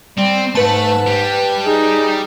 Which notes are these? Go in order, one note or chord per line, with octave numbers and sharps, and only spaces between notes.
G3 C4
G#2 A3 B4 A5
G3
D#4 G#4